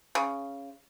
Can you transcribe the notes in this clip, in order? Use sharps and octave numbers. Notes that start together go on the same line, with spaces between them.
C#3